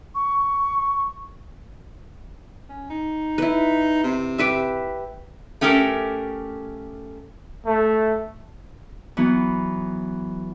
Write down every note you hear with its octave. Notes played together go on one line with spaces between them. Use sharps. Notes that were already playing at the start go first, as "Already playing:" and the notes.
C#6
C#4
D#4
E4 B4
C3
G4 B4 E5
A3 C#4 G4 A4 A#4
A3
E3 F#3 B3